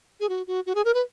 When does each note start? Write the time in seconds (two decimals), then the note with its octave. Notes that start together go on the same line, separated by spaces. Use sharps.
0.20 G#4
0.29 F#4
0.47 F#4
0.66 F#4
0.75 G#4
0.85 A#4
0.94 B4